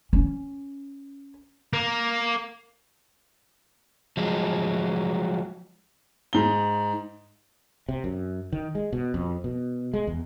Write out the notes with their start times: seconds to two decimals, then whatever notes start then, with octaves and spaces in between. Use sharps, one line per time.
0.13 C#4
1.73 A#3
4.17 F3 F#3 G#3
6.33 G#2 G7
7.89 C3
8.04 F#2
8.53 D#3
8.75 G#3
8.93 B2
9.14 F2
9.44 B2
9.94 G#3
10.07 E2